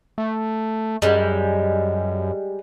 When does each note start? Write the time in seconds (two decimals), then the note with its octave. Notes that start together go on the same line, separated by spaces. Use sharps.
0.18 A3
1.02 F#2 G3 G#3